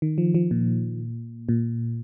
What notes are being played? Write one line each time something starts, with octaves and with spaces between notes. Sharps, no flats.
D#3
F3
F3
A#2
A#2